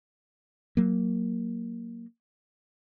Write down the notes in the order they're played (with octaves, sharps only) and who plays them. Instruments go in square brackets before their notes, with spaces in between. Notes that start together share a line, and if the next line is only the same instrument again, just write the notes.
[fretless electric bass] F#3 A#3